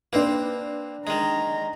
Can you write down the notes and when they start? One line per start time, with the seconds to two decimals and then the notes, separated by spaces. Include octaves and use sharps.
0.13 A#3 C4 D4 B4
1.07 D#3 G#3 A#5